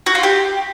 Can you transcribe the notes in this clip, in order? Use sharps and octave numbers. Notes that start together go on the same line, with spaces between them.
F#4
F4
G4